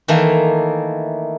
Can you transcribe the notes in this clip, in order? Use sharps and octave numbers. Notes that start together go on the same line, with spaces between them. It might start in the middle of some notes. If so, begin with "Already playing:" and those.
D#3 E3 A3 A#3